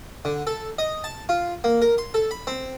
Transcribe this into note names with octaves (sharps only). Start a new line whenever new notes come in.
D3
A4
D#5
A5
F4
A#3
A#4
C6
A4
B5
C4